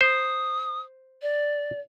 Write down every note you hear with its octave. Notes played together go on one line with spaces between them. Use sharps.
C5 D#6
D5